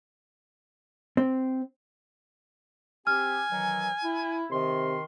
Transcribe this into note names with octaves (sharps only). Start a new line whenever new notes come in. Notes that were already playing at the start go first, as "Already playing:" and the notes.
C4
C4 G4 G#5 F6
D#3 E3 F#3
E4
C3 D#3 C6